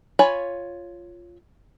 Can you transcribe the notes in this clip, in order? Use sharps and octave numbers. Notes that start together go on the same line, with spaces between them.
F4 C#5 G#5 B5